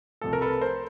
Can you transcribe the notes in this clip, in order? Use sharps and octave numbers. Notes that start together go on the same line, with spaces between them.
C2 C3 F3 A3 A4
A#4
A4 B4
A#4 C5